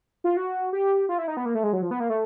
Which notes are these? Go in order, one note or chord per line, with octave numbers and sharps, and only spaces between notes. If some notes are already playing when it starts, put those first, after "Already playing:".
F4
F#4
G4
F4
E4
D#4
B3
A#3
A3
G#3
F#3
F3
B3
A#3
A3